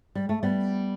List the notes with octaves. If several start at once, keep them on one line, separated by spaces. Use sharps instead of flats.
G3
A3
G3 B3